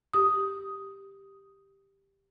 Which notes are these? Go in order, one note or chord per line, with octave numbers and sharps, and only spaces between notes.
G4 D#6